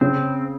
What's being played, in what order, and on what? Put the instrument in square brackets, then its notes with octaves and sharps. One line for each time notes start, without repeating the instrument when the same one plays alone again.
[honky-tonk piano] C#3 [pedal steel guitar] C4